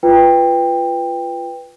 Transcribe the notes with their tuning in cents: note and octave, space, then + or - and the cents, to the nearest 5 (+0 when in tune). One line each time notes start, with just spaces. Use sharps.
F4 -15 B4 +0 G5 +15